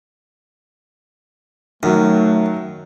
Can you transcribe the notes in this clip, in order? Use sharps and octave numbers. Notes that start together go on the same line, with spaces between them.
F#2 D#3 F#3 A3